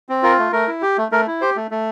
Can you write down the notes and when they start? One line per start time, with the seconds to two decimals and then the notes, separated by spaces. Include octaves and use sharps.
0.09 C4
0.23 F4 A#4
0.39 A3
0.52 A3 A#4
0.67 E4
0.82 G4
0.98 A3
1.12 A3 A#4
1.27 E4
1.41 G4 C5
1.56 A3
1.71 A3